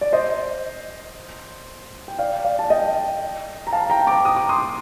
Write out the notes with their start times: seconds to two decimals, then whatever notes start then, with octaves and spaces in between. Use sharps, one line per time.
0.01 D5
0.13 C5 D#5
2.08 G5
2.19 D5 F5
2.45 D5 F5
2.59 A5
2.70 D#5 G5
3.67 A#5
3.73 F5 A5
3.90 G5 A#5
4.07 A#5 D6
4.25 D#6
4.36 D6
4.49 C6 D#6